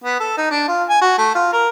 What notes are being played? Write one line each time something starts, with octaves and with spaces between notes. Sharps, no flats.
B3
A4
D#4
D4
F4
G#5
F#4
A3
F4
A#4